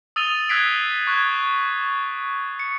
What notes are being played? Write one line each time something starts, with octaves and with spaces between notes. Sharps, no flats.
D#6 E6 A6 D#7 F7 G7
E6 F#6 G#6 B6 C7 D7
C#6 F#6 G#6
C#7